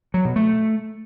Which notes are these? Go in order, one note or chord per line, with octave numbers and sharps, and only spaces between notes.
F#3
B2
A3